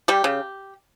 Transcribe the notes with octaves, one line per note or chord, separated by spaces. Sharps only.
G3 G4
C#3